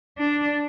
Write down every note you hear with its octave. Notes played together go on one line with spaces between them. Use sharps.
D4